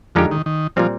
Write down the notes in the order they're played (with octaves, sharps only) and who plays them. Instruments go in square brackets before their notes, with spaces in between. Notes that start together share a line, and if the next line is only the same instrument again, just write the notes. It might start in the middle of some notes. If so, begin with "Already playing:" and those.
[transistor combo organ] F2 F3 [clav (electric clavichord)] D3 G#3 D#4 G4
[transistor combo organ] D#3
D#3
[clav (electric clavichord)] A#2 G3 C4 [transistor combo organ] F3